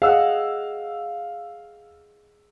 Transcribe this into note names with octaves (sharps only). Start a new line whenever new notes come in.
G#4 D#5 F5 F#5 E6